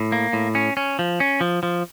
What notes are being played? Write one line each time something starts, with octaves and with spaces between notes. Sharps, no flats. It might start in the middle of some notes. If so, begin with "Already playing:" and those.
Already playing: A2
A#3
A2
C#4
C#4
F3
C#4
F3
F3